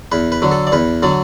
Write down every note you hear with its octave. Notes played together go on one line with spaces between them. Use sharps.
E2 B4
B4
D3 F#3
A4
D5
E2 B4
D3 F#3 D5